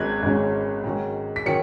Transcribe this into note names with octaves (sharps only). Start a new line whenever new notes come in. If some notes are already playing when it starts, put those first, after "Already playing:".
Already playing: G#1 G#2 F#3 C#4 F#6 G#6
G#1 G#2 F#3 C#4
G#2 D#3 F#3 C#4
B6
D#3 F#3 C#4 C#7